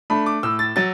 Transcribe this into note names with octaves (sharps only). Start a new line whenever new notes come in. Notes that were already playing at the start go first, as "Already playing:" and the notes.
A3 D4 B5
D6
A2 E6
A6
F#3 A6